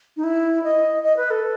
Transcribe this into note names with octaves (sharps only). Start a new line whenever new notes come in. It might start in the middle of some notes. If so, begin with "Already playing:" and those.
D#4
E4
D#5
D#5
B4
A4